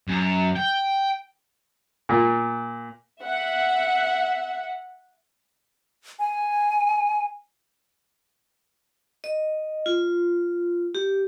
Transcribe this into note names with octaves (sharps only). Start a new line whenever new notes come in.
F#2
G5
A#2
E5 F#5
G#5
D#5
F4
G4